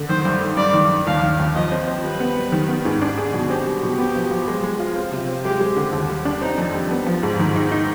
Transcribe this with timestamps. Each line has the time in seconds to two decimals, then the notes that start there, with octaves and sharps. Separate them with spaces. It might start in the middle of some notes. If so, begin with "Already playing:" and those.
Already playing: D3
0.09 D#3 C5
0.25 G2
0.41 G2
0.57 G2 D5
0.74 D#3
0.90 G2
1.07 D#2 F5
1.23 D#3
1.39 D#2
1.55 F3 D#5
1.72 C4
1.87 C4
2.03 G3 B4
2.20 B3
2.37 G3
2.52 D#3
2.68 B3
2.85 G#2
3.02 D4
3.17 G#4
3.33 B2
3.49 C4 G4
3.66 G3
3.83 B2
3.98 B3 G4
4.15 F3
4.31 F3
4.48 G#3
4.63 G#3
4.80 F4
4.96 C4
5.12 C3
5.28 C4
5.45 G#3 G4
5.61 G#3
5.76 D3
5.93 D#2
6.09 G3
6.25 D4
6.41 C4 D#4
6.58 F2
6.74 G3
6.91 B3
7.07 F3
7.23 G#2
7.40 D#3
7.56 D#4
7.72 D#4